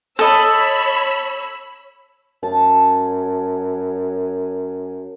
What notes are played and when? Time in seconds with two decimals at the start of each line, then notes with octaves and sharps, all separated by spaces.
0.19 A4 C#5 D#5 B5 E6
2.43 F#2 A5